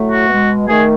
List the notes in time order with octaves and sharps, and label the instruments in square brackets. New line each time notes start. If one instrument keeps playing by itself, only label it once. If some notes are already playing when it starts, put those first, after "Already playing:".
Already playing: [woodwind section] A2 F#3 A3
F#4
B2 G#3
D#3 A3 G#4